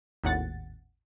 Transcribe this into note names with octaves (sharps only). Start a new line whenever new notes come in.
G#1 D#2 A2 F#5 A6